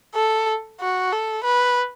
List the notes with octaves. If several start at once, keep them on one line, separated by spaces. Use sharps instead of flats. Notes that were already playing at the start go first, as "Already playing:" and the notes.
A4
F#4
A4
B4